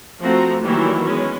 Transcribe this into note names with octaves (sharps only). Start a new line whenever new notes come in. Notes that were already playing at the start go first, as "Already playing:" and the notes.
F3 A3 C4 F#4 A#5
D#3 E3 F#3 G3 A#3 E4
G#3 B3 C#4